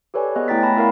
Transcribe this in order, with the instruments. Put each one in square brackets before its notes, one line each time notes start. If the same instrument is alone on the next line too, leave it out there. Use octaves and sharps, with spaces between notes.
[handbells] G4 A4 B4 C#5 D5 G#5
B3 G#4 C#5 D#5 F#6
A3 E4 G5 A#5 A6 B6
G5 A5 B5 A#6
B3 E4 A#4 C#5 F5 B5